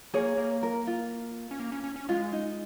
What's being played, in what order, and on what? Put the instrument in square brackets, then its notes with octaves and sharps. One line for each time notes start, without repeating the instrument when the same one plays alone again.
[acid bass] A#3 [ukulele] G#4 C#5
[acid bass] A#3
[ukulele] A#4
F4
[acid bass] C#4
A#3
C#4
C#4
C#4
[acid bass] G#3 [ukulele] F4
[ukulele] D#4